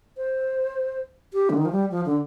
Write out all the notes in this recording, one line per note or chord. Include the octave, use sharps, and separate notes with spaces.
C5
G4
D3
D#3
F3
G3
F3
D3